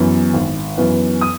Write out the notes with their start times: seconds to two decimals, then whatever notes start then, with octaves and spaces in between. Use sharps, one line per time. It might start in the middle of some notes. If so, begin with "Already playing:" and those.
Already playing: F#2 E3 B3
0.34 G#1
0.78 F#2 E3 B3
1.21 D#6